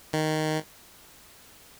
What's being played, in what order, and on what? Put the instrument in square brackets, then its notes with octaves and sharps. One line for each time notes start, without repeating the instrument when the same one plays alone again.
[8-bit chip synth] D#3